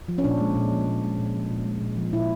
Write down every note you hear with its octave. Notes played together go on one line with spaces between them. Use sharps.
F3
C#4
A#2 D4
G#3
A#2
F3
A#2
G#3
A#2
F3
A#2
G#3
A#2
F3
A#2 E4